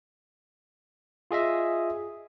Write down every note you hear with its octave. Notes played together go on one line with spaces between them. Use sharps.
F4 G#4 D#5 E5